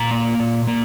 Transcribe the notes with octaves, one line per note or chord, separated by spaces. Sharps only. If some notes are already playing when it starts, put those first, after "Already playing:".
Already playing: A#2 A#5
A#3
A#2
A#3